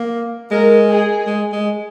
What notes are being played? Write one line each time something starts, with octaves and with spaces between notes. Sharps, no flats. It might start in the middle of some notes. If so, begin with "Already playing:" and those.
Already playing: A#3
G#3 A#4
G#4
G#3
G#3